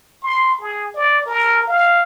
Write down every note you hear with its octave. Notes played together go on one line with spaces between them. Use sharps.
C6
G#4
D5
A#4
F5